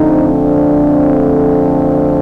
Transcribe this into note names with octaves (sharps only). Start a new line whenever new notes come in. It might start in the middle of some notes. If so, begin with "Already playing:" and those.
Already playing: F2 D3 A3 C4 D#4
D4